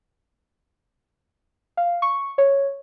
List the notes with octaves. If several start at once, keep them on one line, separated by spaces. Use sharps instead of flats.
F5
C#6
C#5